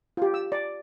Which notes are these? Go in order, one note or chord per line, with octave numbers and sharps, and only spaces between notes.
F4 G4
E6
D5